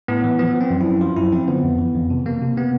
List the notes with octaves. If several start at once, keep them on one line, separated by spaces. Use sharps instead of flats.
A2 B3
E3
F3 B3
F3
C4
F#2
E4
F#2
F3 F4
F#2 E4
F3 C4
D3 B3
F2
E3
F2
C3
C3 A#3
C3
C3 B3